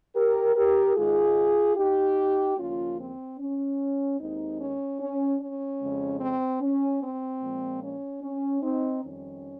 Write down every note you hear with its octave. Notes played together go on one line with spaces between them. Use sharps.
G4 A#4
G4 A#4
G#2 D#3 G#3 F4 G#4
D#4 G4
D#2 C#3 F3 A#3 C#4 F4
C4
C#4
D#2 D#3 G#3 C4 D#4
C#4
C#4
C#4
F2 C#3 G#3
C4
C#4
C4
A#2 F3 G#3
C#4
C#4
C4 D#4
F2 D#3 G3 C#4